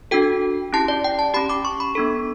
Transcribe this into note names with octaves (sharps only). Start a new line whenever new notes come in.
D4 F#4 A4 G5
C#4 E4 G4 A5
D5
G5
A5
C#4 G4 B5
D6
C#6
B5
B3 D4 A4